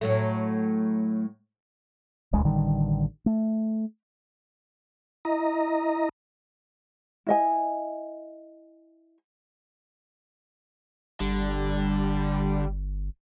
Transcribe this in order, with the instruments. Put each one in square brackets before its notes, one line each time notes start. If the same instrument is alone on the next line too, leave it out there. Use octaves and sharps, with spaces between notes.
[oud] A2 F#3 A3
[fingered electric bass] D#1 C#2 G#3
A1 D3 D#3 G3
A3
[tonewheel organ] E4 D#5 A#5
[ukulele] E4 D#5 G#5
[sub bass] G1 [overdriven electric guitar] D3 [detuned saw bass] G3